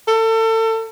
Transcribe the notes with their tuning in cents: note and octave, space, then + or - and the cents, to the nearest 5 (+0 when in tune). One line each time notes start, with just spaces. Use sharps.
A4 +30